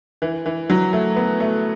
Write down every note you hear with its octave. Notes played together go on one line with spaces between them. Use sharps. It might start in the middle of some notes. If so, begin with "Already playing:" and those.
E3
E3
F#3
A3
B3
A3